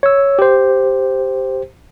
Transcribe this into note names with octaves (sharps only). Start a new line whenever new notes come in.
C#5 E6
G4 C5